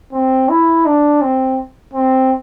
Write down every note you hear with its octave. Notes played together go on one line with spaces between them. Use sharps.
C4
E4
D4
C4
C4